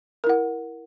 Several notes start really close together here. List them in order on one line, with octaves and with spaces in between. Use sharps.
A#4 E4 F#5